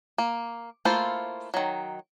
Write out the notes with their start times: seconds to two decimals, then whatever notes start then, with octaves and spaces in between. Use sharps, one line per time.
0.18 A#3
0.85 A3 A#3 E4 F4 C5
1.54 D#3 F#3